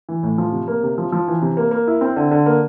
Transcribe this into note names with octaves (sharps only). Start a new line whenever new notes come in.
E3
A2
F3
C3
A#3
C3
F3
F3
E3
C3
A#3
A#3
E4
C4
D3
D3
A#3